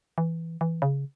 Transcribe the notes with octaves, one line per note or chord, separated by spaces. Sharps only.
E3
E3
C#3